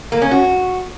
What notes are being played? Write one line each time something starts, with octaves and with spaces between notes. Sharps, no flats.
A#3
C#4
F#4